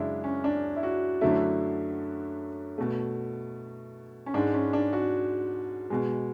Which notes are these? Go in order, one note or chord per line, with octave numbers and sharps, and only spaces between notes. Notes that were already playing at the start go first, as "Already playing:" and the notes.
Already playing: F#2 C#3 G#3 D4 E4
C#4
D4
E4
F#4
F#2 D3 F#3 A3 E4
B2 A3
C#4
G#2 G#3 D4
C#4
D4
F#4
B2 G#3